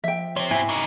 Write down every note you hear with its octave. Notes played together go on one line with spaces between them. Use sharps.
F3 E5 G5
C3 C4 C#5
G#2 E4 F#4 G#5
C#3 D#4 F#4 G#5 D6